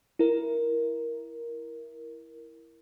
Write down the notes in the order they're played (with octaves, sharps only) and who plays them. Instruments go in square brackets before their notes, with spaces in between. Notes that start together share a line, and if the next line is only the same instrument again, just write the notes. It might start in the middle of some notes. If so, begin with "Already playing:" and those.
[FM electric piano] E4 A#4